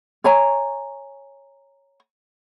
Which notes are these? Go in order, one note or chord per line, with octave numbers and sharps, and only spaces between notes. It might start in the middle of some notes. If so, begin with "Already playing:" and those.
C#5 G#5 A#5